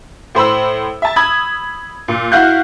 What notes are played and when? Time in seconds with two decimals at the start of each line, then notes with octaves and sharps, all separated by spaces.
0.35 A2 C5 B5 E6
1.02 E5 A5
1.16 B5 D#6 E6 G#6
2.08 A#2
2.32 E4 F#4 F5 F#6 G6